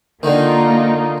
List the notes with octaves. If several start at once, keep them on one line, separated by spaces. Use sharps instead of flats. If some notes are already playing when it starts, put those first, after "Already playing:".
D3 D#3 A#3 D#4 F4